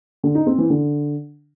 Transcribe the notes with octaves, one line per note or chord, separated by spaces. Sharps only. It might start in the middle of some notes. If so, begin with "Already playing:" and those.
D3
D#4
C4
E3
D3